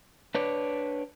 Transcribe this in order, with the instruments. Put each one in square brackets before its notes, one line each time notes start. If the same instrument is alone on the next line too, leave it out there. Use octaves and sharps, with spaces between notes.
[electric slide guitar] D4 B4 C#5 D5